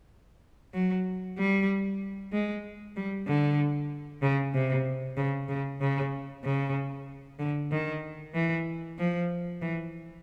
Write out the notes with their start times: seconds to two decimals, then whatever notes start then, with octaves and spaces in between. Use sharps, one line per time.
0.74 F#3
1.38 G3
2.32 G#3
2.96 G3
3.27 D3
4.23 C#3
4.54 C3
5.17 C#3
5.49 C#3
5.81 C#3
6.44 C#3
7.39 D3
7.71 D#3
8.34 E3
8.98 F3
9.62 E3